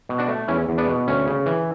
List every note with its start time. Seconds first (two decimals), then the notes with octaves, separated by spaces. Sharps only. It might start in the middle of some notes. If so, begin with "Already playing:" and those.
0.09 B2
0.18 D4 F#4
0.28 A3
0.48 E2 C#4 E4
0.69 E2
0.78 B3 D4
0.88 B2
1.08 D2 C#4
1.27 C#3
1.46 E3